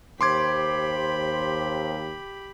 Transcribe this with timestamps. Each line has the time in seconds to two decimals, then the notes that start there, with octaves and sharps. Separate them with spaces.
0.21 D#2 G4 C5 B5 C6 D6 G#6